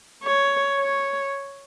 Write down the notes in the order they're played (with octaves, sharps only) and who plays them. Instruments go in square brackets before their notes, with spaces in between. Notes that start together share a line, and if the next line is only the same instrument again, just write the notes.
[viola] C#5
C#5